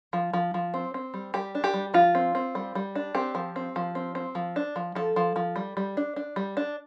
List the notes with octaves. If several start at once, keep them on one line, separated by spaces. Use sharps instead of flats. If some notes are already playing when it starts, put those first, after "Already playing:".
F3
F3
F3
C4
C4
G3
G3 G4
D4
G4
G3
F3 F4
C4
C4
G3
G3
D4
C4 G4
F3
C4
F3
C4
C4
F3
D4
F3
F3 A4
F3
F3
G3
G3
D4
D4
G3
D4